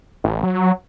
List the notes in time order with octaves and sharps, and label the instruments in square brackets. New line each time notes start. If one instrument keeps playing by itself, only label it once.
[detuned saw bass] A1
F#3